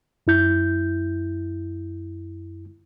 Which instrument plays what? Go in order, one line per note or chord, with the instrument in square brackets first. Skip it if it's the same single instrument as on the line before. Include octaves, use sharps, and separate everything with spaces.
[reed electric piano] F#2 E4 G6